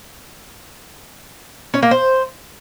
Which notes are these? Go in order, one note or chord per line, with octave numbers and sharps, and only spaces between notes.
C#4
A#3
C5